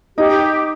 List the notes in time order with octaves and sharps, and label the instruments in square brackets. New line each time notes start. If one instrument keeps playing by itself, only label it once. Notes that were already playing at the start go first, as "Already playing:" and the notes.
[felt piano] D#4 D#5 [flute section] G4